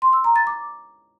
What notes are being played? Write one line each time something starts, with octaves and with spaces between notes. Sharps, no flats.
C6
E6
A#5
A6
D6